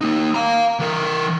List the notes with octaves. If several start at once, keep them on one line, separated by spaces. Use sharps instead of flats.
A#3 D#4
F5 A#5
E3 A#4